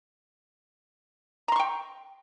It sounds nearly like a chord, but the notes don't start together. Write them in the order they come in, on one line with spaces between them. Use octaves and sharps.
A#5 C6 C#6 G5